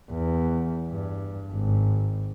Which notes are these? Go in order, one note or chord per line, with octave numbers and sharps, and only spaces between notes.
E2
G2
G#1